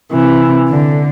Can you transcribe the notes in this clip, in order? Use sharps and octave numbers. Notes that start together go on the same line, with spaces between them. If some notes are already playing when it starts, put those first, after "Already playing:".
C3 E3
D3